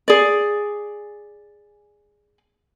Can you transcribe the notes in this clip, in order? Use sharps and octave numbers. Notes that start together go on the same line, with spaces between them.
G#4 D5